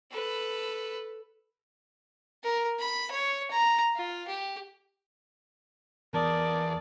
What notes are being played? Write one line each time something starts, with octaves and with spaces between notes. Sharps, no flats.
A4 B4
A#4
B5
C#5
A#5
F4
G4
E2 A#4 D5 A5 D#6